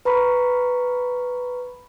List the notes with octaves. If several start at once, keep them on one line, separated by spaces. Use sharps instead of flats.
B4 A#5 B5 C#6